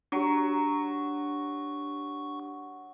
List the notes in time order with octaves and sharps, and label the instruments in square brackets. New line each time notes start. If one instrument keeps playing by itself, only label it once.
[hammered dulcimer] F#3 [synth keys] D4 G4 [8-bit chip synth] C#6